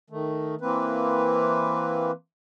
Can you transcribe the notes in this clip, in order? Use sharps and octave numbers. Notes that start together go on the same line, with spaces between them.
D#3 A3
E3 A#3 C4 B4